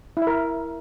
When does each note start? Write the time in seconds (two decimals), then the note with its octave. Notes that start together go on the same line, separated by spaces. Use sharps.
0.17 E4
0.22 E5
0.27 A#4